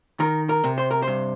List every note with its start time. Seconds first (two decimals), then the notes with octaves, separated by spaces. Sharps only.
0.20 D#3 A#4
0.49 A#4
0.64 C3
0.78 C5
0.91 A#4
1.02 C5
1.08 G2